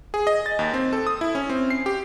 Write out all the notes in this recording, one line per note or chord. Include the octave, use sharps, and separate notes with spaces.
G#4
D#5
A6
D#2
C4
A4
D#6
E4
C#4
C4
C7
G4